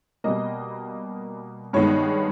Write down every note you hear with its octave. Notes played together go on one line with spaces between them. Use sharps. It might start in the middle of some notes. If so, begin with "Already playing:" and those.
B2 G3 A#3 D#5
G2 D#3 G#3 B3 C#5